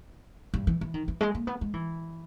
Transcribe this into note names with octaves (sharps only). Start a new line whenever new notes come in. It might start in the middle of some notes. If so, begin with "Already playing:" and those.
G2
E3
E3
D#3
E3
G#3
A#3
B3
G#3
E3